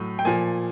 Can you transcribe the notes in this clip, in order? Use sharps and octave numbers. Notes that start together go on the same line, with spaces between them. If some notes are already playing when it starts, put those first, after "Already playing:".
Already playing: A2 F#3
G5
A#2 F3 G#5